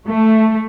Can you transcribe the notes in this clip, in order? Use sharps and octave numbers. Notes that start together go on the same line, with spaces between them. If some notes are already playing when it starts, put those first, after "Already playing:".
A3